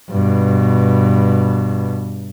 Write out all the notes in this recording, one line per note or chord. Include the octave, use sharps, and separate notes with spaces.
G2 B2